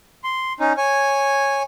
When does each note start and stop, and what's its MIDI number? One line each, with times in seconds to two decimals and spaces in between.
0.24 0.53 84
0.60 0.73 61
0.60 0.73 63
0.77 1.63 73
0.77 1.63 80